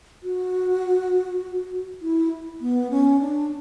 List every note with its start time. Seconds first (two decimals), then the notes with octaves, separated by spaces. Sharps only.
0.23 F#4
2.02 E4
2.61 B3
2.91 C#4
3.20 D4